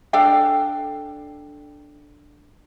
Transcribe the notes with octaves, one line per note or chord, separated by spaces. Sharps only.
D4 A4 F5 G5